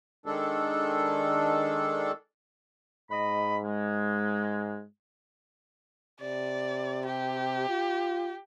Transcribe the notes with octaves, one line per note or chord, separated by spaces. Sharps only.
D#3 G#3 D4 A4
G#2 D#5 B5
G#3
C3 D5
G4
F4